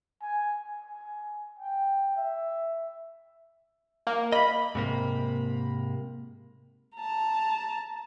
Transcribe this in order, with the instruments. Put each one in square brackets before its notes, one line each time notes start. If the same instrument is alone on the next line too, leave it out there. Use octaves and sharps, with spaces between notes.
[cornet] G#5
G#5
G5
E5
[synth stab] A#3
[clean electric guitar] D#5 [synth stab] B5
[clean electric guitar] G#2 C3 A#3
[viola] A5 A#5